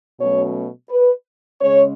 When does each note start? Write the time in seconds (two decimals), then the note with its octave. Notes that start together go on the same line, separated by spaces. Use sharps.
0.20 B2 F#3 A3 C#4 C#5
0.90 B4
1.60 C#3 G#3 C#4 C#5